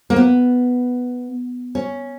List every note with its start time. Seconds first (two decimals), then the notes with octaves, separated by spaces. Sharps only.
0.10 A#3
0.16 B3
1.75 C#4